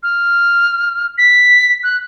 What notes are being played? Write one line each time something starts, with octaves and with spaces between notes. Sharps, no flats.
F6
B6
F#6